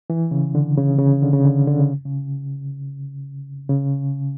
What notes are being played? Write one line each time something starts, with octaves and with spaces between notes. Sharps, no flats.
E3
C#3
D3
C#3
C#3
D3
C#3
D3
D3
C#3
C#3
C#3